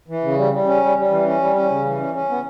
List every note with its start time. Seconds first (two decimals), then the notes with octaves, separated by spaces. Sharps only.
0.08 E3
0.23 C#3
0.37 G3
0.52 G3
0.67 C#4
0.82 G3
0.97 G3
1.10 E3
1.26 C#4
1.41 G3
1.56 C#4
1.70 C#3
1.85 E3
2.00 C#4
2.14 C#4
2.30 B3